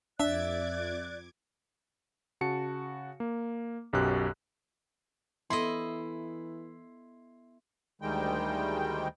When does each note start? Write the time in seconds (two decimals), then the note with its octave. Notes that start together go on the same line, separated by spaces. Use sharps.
0.20 F2 D4 D5 E5 D6 F#6 G#6
2.41 C#3 F#4 A5 C#7
3.20 A#3
3.93 B1 F#2 B2 G4 F#6
5.50 E3 B3 E4 A4 D#5 C6
8.02 D2 D#3 G3 G#3 G5